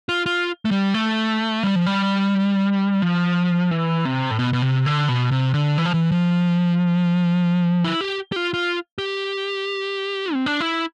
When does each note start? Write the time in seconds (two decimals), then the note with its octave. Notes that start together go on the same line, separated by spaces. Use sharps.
0.09 F4
0.26 F4
0.65 A3
0.71 G3
0.94 A3
1.63 G3
1.76 F3
1.86 G3
3.02 F3
3.71 E3
4.05 C3
4.31 A2
4.39 B2
4.53 B2
4.62 C3
4.86 D3
5.08 B2
5.31 C3
5.54 D3
5.78 E3
5.85 F3
5.94 E3
6.12 F3
7.84 E4
8.01 G4
8.32 G4
8.36 F4
8.54 F4
8.98 G4
10.33 C4
10.46 D4
10.60 E4